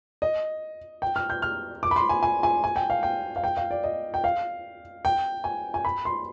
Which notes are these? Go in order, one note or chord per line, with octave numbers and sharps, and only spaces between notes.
D#5
G5
F6
G6
F6
D6
B5
C6
G#5
G#5
G#5
G#5
G5
F5
G5
F5
G5
F5
D5
D#5
G5
F5
G5
G#5
G#5
B5
C6